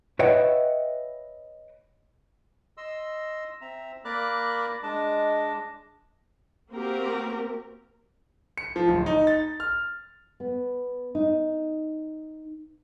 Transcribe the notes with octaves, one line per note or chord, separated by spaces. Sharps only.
B4 C#5 D#5 E5 F#5 G5
D#5 C6 E6
C4 E5 A#5
A#3 A#4 D5 B5 D6 F#6
G#3 D4 D#5 A5 D6
A#3 C4 F#4 G4 A#4
C#7
F3
D1
D#4
A6
F6
B3
D#4